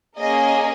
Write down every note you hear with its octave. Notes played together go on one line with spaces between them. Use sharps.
A#3 C#4 G#4 D#5